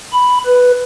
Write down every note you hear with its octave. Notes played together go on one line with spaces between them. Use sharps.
B5
B4